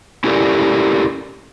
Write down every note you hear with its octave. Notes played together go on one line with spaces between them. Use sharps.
C#4 E4 G4 A4 A#4 D5